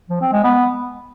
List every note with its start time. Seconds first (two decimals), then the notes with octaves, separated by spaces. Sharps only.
0.10 F3
0.21 C4
0.33 G#3
0.44 B3